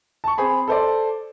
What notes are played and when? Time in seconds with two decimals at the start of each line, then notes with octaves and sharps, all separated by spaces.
0.24 A5 C#6
0.38 C4 G#4 B5
0.68 A4 C5 D5